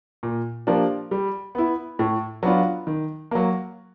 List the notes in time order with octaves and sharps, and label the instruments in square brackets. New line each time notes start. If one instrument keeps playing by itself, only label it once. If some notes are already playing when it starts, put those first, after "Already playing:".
[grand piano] A#2
F3 A#3 D4 G4
G3
B3 E4
A2
F#3 B3 D4 F4
D#3
F#3 A#3